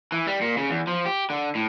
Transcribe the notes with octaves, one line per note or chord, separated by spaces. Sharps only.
E3
G3
A#2
C#3
E2
F3
G4
D3
A2